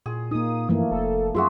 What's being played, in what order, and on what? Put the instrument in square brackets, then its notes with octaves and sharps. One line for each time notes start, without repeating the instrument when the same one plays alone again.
[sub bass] A#2 [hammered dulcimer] G#4
[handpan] A#3 D#4 [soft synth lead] D#6
[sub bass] G2 [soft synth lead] E3 [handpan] F3 A3 A#3
[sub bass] F1 [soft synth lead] A4
[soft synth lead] F#2 [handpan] F4 G#4 [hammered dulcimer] F#4 E5 C6